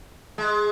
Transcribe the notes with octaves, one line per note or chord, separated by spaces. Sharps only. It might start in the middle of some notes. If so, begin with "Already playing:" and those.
G#3